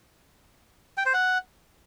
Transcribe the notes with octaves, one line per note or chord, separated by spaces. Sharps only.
G5
C5
F#5